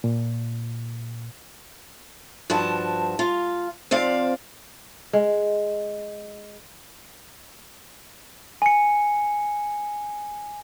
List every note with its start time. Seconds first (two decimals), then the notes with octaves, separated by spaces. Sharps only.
0.04 A#2
2.50 G2 F3 F#4 G4 A5
3.19 F4 F5
3.91 F3 C4 D5 F5
5.13 G#3
8.62 G#5 C#7